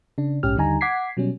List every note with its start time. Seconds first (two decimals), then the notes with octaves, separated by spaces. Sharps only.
0.18 C#3 D4
0.43 A#1 G#2 C#4 G4 F6
0.56 D#2 D3 G3 D#4 G#5 A#5
0.81 F#5 D6 G#6 B6 C7
1.17 B2 F#3 G3 C#4